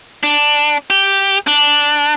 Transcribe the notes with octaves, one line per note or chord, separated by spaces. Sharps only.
D4
G4
D4